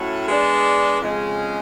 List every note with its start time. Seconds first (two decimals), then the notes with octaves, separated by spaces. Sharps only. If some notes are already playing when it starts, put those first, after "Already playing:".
Already playing: A2 F#3 A3 C#4 F#4
0.28 G#3 B3 D4
1.01 F2 C#3 G#3 C#4